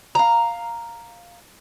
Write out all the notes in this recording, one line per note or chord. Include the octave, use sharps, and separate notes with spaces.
F5 A#5